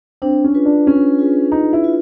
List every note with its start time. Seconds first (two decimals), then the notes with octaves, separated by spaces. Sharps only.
0.22 C4 D4
0.44 C#4
0.54 F4 G#4 B4
0.65 D4
0.87 C#4 D4
1.19 F4 G#4 B4
1.51 D4 D#4
1.73 E4
1.84 F4 G#4 B4